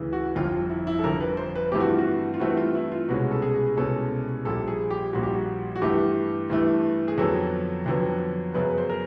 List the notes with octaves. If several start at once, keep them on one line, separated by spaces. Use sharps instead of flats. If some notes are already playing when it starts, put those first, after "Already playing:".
Already playing: D2 C#3 E3
F#4
G1 F2 D3 F4
F4
E4
E4
A4
G1 F2 D3 A#4
B4
C5
B4
G2 E3 A3 C4 G4
F#4
F4
F#4
F4
G2 E3 A3 C4 F#4
F4
E4
F4
C2 B2 G#3 C#4 F#4
A4
G#4
C2 B2 G#3 C#4 A4
A#1 A#2 G3 A4
G#4
G4
A#1 A#2 G3 F#4
G4
F#4
F#4
G2 E3 A3 G4
G2 E3 A3
G#4
F2 D3 F#3 B3 A4
F2 D3 F#3 B3
F#2 C#3 F#3 B3 B4
B4
C5
A#4